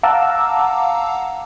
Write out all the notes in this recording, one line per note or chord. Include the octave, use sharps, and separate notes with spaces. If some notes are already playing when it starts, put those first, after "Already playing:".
F5 F#5 A5 A#5 D6 E6